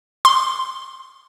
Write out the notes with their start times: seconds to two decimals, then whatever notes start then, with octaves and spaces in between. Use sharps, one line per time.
0.25 C6